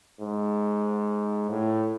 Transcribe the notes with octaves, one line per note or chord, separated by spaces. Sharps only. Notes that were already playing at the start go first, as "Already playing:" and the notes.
G#2
A2